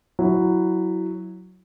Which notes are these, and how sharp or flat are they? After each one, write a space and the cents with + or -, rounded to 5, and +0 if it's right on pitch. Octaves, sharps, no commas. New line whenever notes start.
F#3 +0 E4 +0